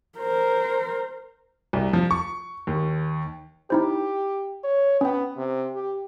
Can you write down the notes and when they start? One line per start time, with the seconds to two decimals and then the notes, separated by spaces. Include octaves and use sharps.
0.19 A#4 C5
1.73 C2
1.93 F3
2.11 C#6
2.67 D#2
3.70 D#4 E4 G4 C5
4.64 C#5
5.01 B3 C#4 G5
5.37 C3
5.75 G4